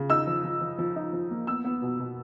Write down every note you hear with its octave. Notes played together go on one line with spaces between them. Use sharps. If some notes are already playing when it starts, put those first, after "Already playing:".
Already playing: C#3
D#4 E6
F3
F3
F3
F3
D#4
F3
A#3
B3 E6
B3
B2
B2